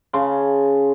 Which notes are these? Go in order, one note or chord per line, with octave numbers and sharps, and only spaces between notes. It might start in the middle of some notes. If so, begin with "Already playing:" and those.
C#3 A5 C6